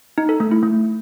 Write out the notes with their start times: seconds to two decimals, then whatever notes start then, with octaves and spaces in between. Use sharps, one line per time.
0.18 D#4
0.29 A4
0.40 A3
0.51 E4
0.63 A3